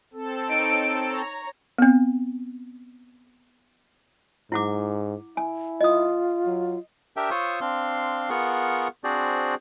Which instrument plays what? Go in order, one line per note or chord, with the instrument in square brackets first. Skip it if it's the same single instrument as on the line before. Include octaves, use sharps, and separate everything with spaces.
[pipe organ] C4 A4
[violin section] D#4 C#5 D7
C#5 A#5
[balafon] B3 C4
[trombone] G#2 [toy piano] E4 F#5 D6
[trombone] E4 [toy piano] G#5
[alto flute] F4 [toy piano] D#5 D#6
[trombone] F#3
[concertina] D4 G4 A#4 E5 G5
F4 C5 C#5 C#6 D#6 E6
C4 D4 F5 C6
B3 F4 G#4 A#4 F#5 C#6
C4 D4 F#4 G#4 C5 D5